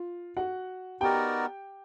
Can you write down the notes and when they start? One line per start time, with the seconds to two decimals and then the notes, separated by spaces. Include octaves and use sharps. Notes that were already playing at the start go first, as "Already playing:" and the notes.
Already playing: F4
0.37 F#4 F#5
1.01 B3 D#4 F#4 G4 A#4 D5 G5